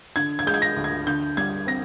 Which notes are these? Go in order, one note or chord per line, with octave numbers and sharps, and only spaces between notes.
D3 G#6
G#6
G#3 G6
G#6
A#6
D2
G#6
D3 G6
G3 G#6
C4 A#6